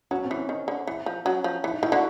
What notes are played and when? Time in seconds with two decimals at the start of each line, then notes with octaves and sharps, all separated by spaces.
0.11 F#3 C#4
0.24 C4
0.31 E3
0.37 C4
0.49 D#3
0.68 D3
0.87 E3
1.06 F3
1.25 F#3 C#4
1.44 F3
1.64 E3
1.73 D#4
1.82 D#3 E4
1.92 D3 F#4